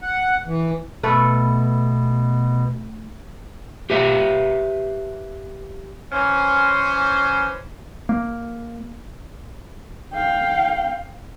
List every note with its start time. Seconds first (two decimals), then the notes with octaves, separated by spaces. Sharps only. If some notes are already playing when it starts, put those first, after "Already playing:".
0.02 F#5
0.46 E3
1.03 B2 A3 A4 B4
3.90 G4 B4 E5 F5
6.12 E3 C#4 C5
8.09 A#3
10.14 F5 G5